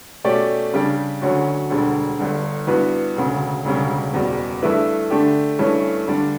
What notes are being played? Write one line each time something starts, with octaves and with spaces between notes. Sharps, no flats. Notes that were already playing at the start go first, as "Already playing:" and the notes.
B2 A3 C#4 G4 D5
C#3 G3 D4 G4
D2 D3 F#3 C#4 F#4
E1 D2 D3 G3
G1 G2 D3
G2 E3 B3 F#4 B4
E1 D2 C#3
E1 D2 C#3 G3
F#1 E2 B2 G3
G2 E3 A3 E4 B4
D3 A3 D4 G4
G2 E3 A3 C#4
G2 D3 G3 D4